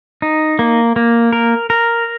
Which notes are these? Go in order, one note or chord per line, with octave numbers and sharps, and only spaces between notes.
D#4
A#3
A#3
A#4
A#4